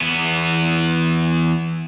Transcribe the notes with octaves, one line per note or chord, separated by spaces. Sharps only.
E2 B3